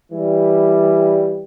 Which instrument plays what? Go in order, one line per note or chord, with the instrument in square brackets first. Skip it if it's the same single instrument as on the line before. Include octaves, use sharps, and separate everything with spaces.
[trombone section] E3 G3